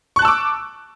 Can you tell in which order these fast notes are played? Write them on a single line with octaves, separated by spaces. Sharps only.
C#6 F#6 A5 E6 D6